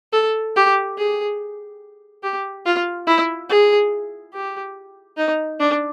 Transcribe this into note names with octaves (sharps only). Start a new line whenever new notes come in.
A4
G4
G#4
G4
F4
E4
G#4
G4
D#4
D4